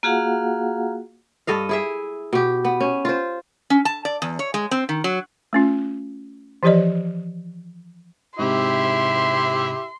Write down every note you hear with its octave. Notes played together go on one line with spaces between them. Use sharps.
A#3 F4 F#4 G#4 F5 F#5
G2 A4 D#5 F5
E4 G#4 E5
B2 G4
B3
C#4
F4 C5
C#4
A5
D5
E2
C#5
G#3
C4
D#3
F#3
A3 C#4 F4
E3 F3 G4 C5 D5 D#5
G#2 C3 E4 G4 E5 C6